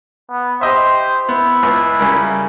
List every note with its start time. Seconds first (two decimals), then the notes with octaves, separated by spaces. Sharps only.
0.30 B3
0.61 G4 C5 D#5 E5
1.29 B3 E4
1.63 C#2
1.99 C#3 G3 A#4